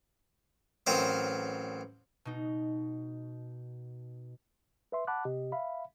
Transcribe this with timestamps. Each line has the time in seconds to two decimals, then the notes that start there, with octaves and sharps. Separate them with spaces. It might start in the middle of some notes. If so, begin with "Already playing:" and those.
0.86 A1 F#3 C4 A#4 F5 D#6
2.25 B2 D#4
4.92 B4 E5 C6
5.07 F#5 A5 B5 D6 F#6
5.25 C3 G4 D#5
5.52 E5 F5 B5